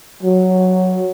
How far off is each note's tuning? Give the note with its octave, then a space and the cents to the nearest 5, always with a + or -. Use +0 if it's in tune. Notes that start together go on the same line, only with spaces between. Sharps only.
F#3 +0